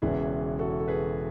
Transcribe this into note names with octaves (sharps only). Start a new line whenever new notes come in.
E1 E2 C#3 E3 E4 G#4
F#4 A4
A4
G#4 B4